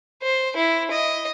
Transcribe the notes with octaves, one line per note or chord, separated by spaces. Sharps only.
C5
E4
D#5